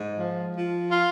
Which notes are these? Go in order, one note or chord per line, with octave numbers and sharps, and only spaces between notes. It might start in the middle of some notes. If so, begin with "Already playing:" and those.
Already playing: G#2
F3
F3
F4